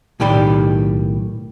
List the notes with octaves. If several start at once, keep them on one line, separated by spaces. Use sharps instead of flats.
B1 A2 D#3 G4 D5 B5